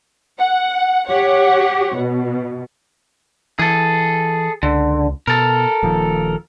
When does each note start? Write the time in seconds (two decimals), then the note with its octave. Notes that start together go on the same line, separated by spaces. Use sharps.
0.38 F#5
1.07 G4 C#5 F#5
1.95 B2
3.59 E3 G#4 A4
4.63 C#2 D3
5.27 B2 A4 A#4
5.83 D#1 D#2 F3